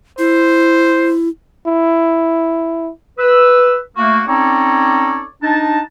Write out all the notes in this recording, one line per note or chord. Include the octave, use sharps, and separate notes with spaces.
E4 C5
E4
B4 E6
A3 A#3 F#4
C4 C#4 D#4 A4 C#5 D5
D4 D#4 D#5 A5